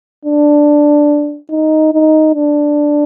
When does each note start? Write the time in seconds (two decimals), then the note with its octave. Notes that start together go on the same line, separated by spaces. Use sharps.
0.25 D4
1.50 D#4
1.93 D#4
2.35 D4